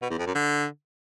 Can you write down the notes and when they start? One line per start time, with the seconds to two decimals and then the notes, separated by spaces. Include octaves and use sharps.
0.02 B2
0.10 E2
0.18 F2
0.27 F#2
0.35 D3